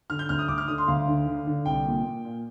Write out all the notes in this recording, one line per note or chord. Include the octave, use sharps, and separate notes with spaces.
D3 F6
G6
D2 F6
D#6
D2 D6
F6
D3 D#6
C6
D2 F5
D3
D3
D3
C2 G5
A#2
A#2
A#2